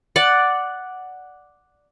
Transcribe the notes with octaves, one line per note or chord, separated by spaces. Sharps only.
D5 F#5